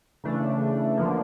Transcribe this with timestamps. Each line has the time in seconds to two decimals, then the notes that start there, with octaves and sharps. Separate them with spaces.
0.24 C#3 E3 A3 D4
0.97 D3 F3 A#3